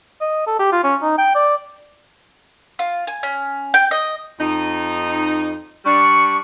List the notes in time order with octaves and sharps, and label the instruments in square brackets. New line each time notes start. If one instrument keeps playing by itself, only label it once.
[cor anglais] D#5
A4
G4
F4
C#4
D#4
G5
D5
[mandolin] F4
G#5
C#4
G5
D#5
[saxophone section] F2 D#4
[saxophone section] G3 D4 [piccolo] C#6